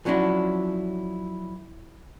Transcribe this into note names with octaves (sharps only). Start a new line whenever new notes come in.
F3 F#3 C#4 D4 E4 F#4